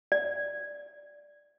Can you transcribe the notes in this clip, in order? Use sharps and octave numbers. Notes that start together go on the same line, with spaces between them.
D5